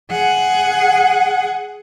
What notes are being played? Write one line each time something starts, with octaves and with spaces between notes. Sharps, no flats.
G#4 F#5